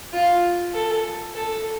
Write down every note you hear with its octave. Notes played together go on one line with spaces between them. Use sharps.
F4
A4
A4